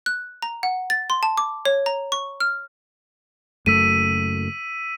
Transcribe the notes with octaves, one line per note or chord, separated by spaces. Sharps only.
F#6
A#5
F#5
A6
C6
A5
D6
C#5
A#5
C#6
F6
F#1 F#2 A3 E6 B6 D#7